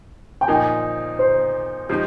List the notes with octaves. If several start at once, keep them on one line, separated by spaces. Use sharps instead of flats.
G5
A#2 F3 A#3 D#4 G#5
C5
C#3 F3 G#3 D#4 G4